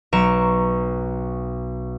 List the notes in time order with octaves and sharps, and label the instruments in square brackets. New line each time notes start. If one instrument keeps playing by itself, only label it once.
[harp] B1 A#5 C#6 D7 E7